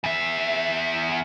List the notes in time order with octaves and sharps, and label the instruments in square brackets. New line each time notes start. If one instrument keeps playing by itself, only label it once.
[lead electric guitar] E2 E5